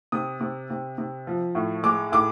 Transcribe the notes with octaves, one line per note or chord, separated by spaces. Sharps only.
C3 D#6
C3
C3
C3
F3
A2
G#3 D6
A2 D6